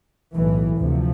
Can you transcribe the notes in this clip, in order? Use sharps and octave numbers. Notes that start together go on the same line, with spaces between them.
B1 A2 E3
D2 C3 F3